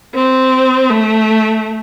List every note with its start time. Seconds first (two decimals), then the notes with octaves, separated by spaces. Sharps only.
0.14 C4
0.90 A3